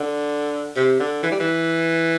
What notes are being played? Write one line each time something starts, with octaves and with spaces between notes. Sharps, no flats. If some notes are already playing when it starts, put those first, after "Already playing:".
Already playing: D3
C3
D3
E3
G3
E3